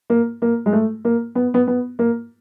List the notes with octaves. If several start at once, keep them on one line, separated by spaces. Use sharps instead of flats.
A#3
A#3
G#3
A3
A#3
B3
B3
B3
A#3